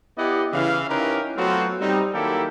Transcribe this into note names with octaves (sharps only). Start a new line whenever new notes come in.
B3 E4 G4 D5 D#5 F#5
C#3 E3 F5
C#4 D#4 E4 G4 A#4 B4
F#3 A3 B3 C4 F4 F#4
G3 C4 D#4
D#3 F#3 A#3 E4 G4 A4